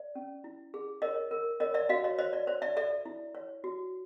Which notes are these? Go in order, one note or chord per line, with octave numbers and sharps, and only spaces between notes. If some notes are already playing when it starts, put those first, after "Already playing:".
Already playing: D5
C#4
E4
G#4
A#4 C#5 D#5
A#4
A#4 C#5 D#5
D5 E5
F#4 D#5 F5
C#5 D#5
C5 C#5 D#5
D5
C5 C#5
D5 E5
A4 D5 E5
E4
C#5
F#4